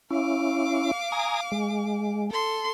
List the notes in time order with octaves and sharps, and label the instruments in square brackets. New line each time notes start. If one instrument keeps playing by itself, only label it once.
[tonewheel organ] C#4 E4 [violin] F5 D6
[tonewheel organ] G#5 A#5 D#6
G#3
[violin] A4 C6